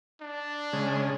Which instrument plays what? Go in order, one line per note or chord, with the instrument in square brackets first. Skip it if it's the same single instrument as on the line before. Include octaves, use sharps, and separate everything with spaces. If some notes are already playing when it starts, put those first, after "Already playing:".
[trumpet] D4
[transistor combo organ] C#3 G#3